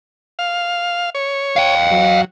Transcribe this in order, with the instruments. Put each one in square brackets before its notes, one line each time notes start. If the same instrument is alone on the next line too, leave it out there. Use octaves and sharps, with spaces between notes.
[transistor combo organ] F5
C#5
[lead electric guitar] F5 G5
[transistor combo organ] F#3